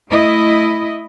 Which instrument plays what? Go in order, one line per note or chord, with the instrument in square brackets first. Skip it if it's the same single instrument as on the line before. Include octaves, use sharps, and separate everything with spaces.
[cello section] A3 E4 D#5